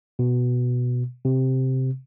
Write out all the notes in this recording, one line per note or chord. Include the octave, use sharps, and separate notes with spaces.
B2
C3